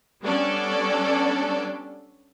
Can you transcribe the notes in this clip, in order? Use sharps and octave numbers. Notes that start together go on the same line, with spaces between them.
G3 B3 C#4 D4 A4 D5